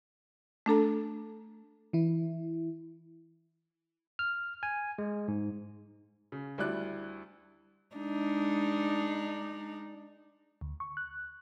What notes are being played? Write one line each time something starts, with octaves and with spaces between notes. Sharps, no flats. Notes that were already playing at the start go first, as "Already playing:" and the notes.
A3 D4 A4 A#5
E3 E4
F6
G#5
G#3
G#2
C#3
D2 G3 E4 D5 F#6
G#3 D4 D#4
D2
C#6
F#6